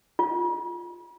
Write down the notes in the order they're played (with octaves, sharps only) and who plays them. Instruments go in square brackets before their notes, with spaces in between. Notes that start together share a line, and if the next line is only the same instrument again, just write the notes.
[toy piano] F4